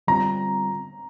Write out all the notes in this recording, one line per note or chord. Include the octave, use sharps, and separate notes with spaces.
D3 G3 C4 F4 A#5